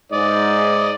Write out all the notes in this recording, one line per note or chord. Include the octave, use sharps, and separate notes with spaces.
G#2 D5 D#5